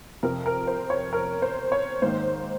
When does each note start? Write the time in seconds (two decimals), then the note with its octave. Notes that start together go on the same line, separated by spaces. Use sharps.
0.23 F2 C3 F3 A#4
0.46 A#4
0.67 C5
0.90 C#5
1.13 A#4
1.42 C5
1.72 C#5
2.02 G#2 D#3 A#3 C5